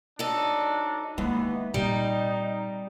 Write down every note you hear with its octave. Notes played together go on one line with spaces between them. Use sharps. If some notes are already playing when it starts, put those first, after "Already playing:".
G#2 F#3 D4 D#4 A4
D#2 E3 G#3 A#3 B3
A#2 G3 C4 D#4